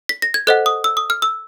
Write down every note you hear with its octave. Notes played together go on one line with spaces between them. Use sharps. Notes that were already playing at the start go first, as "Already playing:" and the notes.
B6
A#6
G#6
A4 C5 D#5 F#5 F#6
D#6
E6
D#6
F6
E6